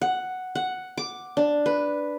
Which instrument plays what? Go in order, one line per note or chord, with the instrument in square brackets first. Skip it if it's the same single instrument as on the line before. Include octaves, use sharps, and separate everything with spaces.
[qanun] F#5
F#5
D6
D4
B4